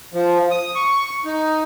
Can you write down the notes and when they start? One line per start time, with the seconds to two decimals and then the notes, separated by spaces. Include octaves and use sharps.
0.13 F3
0.51 D#6
0.75 C#6
1.25 D#4